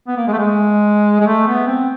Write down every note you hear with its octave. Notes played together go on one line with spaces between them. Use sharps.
B3
A#3
G#3
A3
G#3
G#3
A3
B3
C4